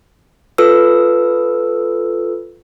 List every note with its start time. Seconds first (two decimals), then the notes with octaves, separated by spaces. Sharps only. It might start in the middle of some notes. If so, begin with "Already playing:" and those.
0.58 F4 A4 B4 E6